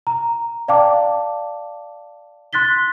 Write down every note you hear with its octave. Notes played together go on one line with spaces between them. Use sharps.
A#5
D5 F5 G5 A5 D6
C6 F#6 A6 B6 G7